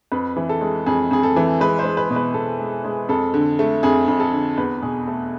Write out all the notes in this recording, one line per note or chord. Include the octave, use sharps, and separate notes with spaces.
F2 B4
E3
A4
G#3
F2 G#4
F2 G#4
A4
E3
G#3 B4
C5
G#3
B4
B2
B4
B2 A4
G#3
G#3
F2 A4
D3
A3
F2 G#4
F2
A4
D3
E2 B4
B2 G#4
A3 A4